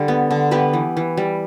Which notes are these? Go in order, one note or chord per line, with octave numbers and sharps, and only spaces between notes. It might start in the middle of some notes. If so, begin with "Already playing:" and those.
Already playing: D3 G3
B3
D3
B3 G4 B4
E3
E3
G3